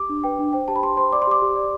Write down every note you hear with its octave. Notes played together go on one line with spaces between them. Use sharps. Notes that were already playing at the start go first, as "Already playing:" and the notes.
Already playing: G4 D6
D4
B4 G5
D4
C5 G5
G4 A5
B5
G4 C6
C5 C6
D5 D6
C6
G4 D6
G4
D5